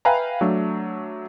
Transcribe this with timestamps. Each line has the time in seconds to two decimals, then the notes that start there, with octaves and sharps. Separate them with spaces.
0.05 B4 E5 F5 G5 G#5 A#5
0.41 F#3 A3 D4